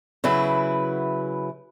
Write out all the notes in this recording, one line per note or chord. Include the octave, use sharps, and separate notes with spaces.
C#3 F#3 E4 B4